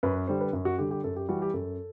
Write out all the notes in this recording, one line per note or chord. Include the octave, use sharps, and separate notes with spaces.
F#2 B4
D3 G3 C5
B4
F#2
F#4
D3 G3 G4
G4
F#2 A4
G4
E3 G3 F#4
G4
F#2 A4